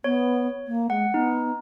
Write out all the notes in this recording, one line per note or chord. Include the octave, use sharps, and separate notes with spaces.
B3 C#5
A#3
G#3 F#5
B3 D#4